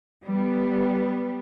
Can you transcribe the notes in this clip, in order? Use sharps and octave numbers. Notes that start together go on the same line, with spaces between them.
G3 B3